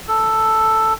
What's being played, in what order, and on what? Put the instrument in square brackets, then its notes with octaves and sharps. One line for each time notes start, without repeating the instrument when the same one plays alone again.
[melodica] A4